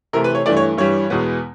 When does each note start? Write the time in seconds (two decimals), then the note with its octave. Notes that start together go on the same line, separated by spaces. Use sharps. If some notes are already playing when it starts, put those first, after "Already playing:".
0.13 C3 E3 A3 A#4
0.24 B4
0.35 C#5
0.46 G2 E3 A3 D5
0.57 C#5
0.77 G2 E3 G3 C#5
1.10 E2 B2 G#3 B3